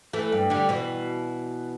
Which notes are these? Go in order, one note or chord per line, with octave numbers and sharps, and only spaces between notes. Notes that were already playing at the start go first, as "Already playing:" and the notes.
E3 A3
G2
D3 G3
B2 E3